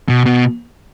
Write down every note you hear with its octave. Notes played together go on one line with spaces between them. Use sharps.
B2
B2